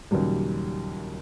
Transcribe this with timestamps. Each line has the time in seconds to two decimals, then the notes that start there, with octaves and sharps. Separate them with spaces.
0.11 D#2 A#2 C#3 F#3 G3